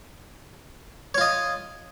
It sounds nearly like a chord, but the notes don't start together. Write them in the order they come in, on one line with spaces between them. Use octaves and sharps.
C#5 F4 D#5